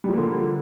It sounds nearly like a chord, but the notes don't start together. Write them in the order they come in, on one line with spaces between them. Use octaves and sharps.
G3 F3 A#3 D3